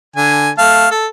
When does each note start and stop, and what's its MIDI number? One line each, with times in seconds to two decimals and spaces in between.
0.16 0.50 50
0.16 0.50 80
0.58 0.87 57
0.58 0.87 77
0.58 0.87 81
0.91 1.06 69